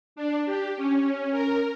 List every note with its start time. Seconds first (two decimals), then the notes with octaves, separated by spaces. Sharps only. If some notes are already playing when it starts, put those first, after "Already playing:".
0.16 D4
0.46 G4
0.77 C#4
1.32 A#4